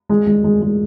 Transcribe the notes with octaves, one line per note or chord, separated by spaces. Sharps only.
G#3
G#3
G#3
G#3